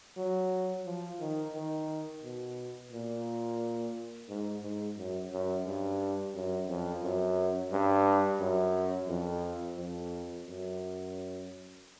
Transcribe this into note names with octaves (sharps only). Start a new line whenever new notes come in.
F#3
F3
D#3
D#3
B2
A#2
G#2
G#2
F#2
F#2
G2
F#2
F2
F#2
G2
F#2
F2
F2
F#2